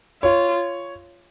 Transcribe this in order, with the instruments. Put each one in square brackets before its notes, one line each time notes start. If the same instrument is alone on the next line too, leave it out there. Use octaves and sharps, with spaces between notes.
[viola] F4 [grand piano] C#5